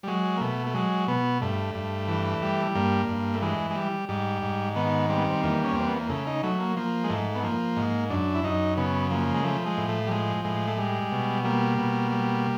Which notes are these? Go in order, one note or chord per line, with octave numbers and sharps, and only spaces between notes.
G3
F#3 G#3
A#3
B2 A3
A3
F#3 G#3
B2 B3
G2 A3
G2
E3
G3
G2 A#3
G2
A3
E3 G#3
G#3
G3
G#2 G3
G#2
D#3 B3
G3 C4
B3
C4
E2 A#3
C#4
E2 C4
B3
A#3
C#3 A3
D#4
F#3 A3
A#3
F3 A#3
G#3
G#2 A3
B3
F3 A#3
G#2
F#2 D4
E4
F#2 D#4
C#3 B3
F3 A#3
G#3
F3 A3
G#3
A2
A3
G3
F3 G#3
A2 G#3
A3
G3 G#3
B2
G3 A#3
B2
G3